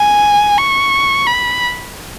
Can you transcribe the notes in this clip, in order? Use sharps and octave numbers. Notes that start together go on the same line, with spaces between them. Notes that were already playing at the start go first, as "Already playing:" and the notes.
Already playing: G#5
C#6
B5